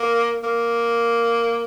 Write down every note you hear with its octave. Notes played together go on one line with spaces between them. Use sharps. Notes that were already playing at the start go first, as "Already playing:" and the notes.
Already playing: A#3
A#3